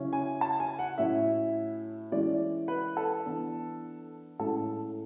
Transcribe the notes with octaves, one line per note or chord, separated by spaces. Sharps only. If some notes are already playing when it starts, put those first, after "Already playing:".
Already playing: C#3 F#3 C#4 E4
G#5
A5
G#5
F#5
A2 F#3 C#4 E4 E5
E3 G#3 C#4 E4 D5
B4
A4
E3 B3 D4
A2 G#3 C#4 A4